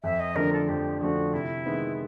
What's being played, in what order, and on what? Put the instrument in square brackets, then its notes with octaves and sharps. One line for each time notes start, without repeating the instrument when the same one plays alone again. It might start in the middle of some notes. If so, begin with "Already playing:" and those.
[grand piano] F2 [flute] E5
[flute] D#5
[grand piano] D3 F3 A3 D4 [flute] A#4
[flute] A4
[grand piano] F2 [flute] G4
[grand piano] D3 F3 A3 D4 [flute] F#4
[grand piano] C3 [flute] E4
[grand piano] D#3 G#3 B3